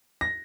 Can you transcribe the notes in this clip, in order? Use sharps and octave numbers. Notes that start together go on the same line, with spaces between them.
A#6